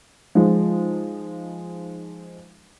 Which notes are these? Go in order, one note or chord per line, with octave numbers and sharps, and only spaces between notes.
F3 G#3 D#4